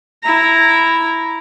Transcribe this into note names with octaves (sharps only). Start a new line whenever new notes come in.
E4 A#5